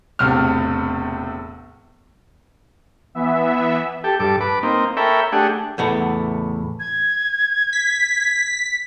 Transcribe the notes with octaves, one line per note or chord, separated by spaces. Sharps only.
E1 A2 C3 F6
E3 B3 E5
G4 A4
G2 A4 D6
B4 D6
A#3 C4 D#4
A4 A#4 C#5 E5 G5 B5
A3 D4 G4 G#4 F#5
E2 A2 B3
G#6
B6